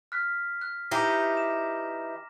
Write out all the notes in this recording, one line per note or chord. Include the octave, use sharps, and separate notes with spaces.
F6 F#6 B6
F#6
E3 D#4 G4 A#5 D6 A#6
E7